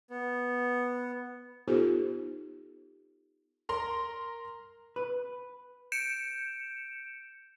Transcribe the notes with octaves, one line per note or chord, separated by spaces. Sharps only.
B3
B3 D#4 F4 G4 A4 C5
A#4 A#5 C6
B4
G6 C#7 D7 E7